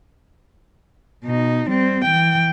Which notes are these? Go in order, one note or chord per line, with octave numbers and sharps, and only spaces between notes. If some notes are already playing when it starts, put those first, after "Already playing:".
B2 D#4
G3 C4
E3 G5